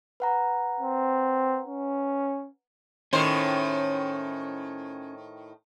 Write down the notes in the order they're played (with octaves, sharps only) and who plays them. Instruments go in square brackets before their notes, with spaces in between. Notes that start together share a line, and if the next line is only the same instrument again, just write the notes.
[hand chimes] B4 F#5 A#5
[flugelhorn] C4
C#4
[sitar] A2 D#3 C5 [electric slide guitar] C#4